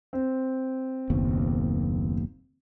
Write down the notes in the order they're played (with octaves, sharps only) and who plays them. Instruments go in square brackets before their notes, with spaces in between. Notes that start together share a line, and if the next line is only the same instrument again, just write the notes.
[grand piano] C4
[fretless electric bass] F#1 D#2 B2